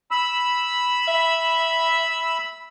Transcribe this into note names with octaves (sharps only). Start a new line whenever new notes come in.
B5 E6
E5